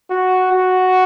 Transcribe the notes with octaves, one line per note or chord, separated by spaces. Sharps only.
F#4
F#4